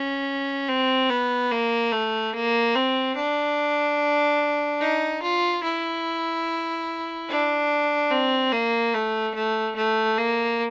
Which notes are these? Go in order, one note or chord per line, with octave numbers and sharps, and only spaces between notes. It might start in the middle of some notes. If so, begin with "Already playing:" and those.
Already playing: C#4
C4
B3
A#3
A3
A#3
C4
D4
D#4
F4
E4
D4
C4
A#3
A3
A3
A3
A#3